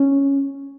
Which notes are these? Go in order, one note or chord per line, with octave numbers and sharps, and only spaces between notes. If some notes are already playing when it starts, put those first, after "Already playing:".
Already playing: C#4